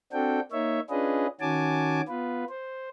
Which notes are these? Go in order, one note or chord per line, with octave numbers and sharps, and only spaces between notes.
C4 D4 F#4 A4 G5
A#3 D#4 C#5 E5
C#4 D4 F4 G#4 B4 D#5
D#3 C#4 F#4 G#5 A5 D6
B3 F4 B4
C5